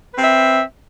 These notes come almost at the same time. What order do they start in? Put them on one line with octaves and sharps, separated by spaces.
B4 C4 E5